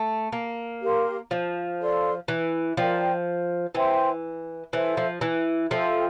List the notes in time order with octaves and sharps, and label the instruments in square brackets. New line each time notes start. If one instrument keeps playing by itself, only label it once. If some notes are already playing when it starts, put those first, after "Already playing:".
Already playing: [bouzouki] A3
A#3
[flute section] G4 A#4 F5 C6
[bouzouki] F3
[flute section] A4 D5 F5 C6
[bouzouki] E3
[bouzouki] F3 [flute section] F4 A#4 D5 G5
[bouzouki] E3 [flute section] C5 E5 G5 C6
[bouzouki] E3 [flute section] A4 C5 E5
[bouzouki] F3
E3
[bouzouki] F3 [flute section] A4 E5 G5 C6